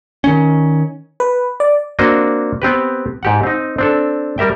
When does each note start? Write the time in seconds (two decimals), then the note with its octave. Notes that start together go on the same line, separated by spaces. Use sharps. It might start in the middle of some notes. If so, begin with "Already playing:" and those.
0.24 D#3 C#4
1.20 B4
1.60 D5
1.99 A#3 C4 D4 F#4 D#5
2.62 B3 C4 G4 B4
3.23 G#2 G4 F#5
3.43 C4 D#4
3.78 C4 D4 A4
4.38 G3 A#4 E5 G5